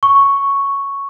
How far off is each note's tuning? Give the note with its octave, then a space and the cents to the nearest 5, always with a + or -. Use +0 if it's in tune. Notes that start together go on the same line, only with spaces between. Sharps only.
C#6 +0